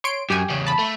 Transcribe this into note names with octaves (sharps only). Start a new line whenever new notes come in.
C#5 C6 D7
F#2 G4 G5 G#5
E2 C#3
A5 B5
A3